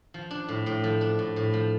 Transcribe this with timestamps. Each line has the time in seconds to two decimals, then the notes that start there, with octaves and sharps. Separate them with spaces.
0.14 F3
0.31 D4
0.49 A2
0.66 A2
0.84 F3
1.01 D4
1.19 A2
1.36 A2
1.53 F3